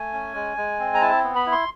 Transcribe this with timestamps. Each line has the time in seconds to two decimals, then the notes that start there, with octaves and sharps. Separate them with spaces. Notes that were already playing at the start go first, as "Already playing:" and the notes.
Already playing: A3 G#5
0.13 C#4
0.34 G#3
0.57 G#3
0.79 C4
0.94 A#5
1.01 E4 A5
1.24 B3
1.35 B5
1.46 E4
1.52 C6